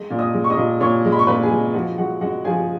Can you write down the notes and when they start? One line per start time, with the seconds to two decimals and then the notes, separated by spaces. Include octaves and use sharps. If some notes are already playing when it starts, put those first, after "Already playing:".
Already playing: G#3
0.10 A#2
0.18 D#5 D#6
0.34 G#3
0.44 C#6
0.50 D#5 D#6
0.57 A#2
0.80 A#2 C#5 C#6
1.05 G#3
1.12 B5
1.19 C#6
1.27 A#2 B4 B5
1.43 G#4 G#5
1.51 G#3
1.74 F3 F#4 F#5
1.98 G#3 F#4 F#5
2.21 G#3 F#4 F#5
2.44 F3 G#4 G#5